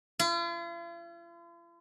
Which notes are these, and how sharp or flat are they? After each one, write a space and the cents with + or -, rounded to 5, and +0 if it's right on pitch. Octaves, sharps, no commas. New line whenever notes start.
F4 -45